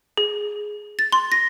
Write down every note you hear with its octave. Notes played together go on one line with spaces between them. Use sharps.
G#4
A6
C6
A#6